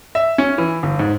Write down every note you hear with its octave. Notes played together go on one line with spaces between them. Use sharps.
E5
C#4
E3
G1
G#2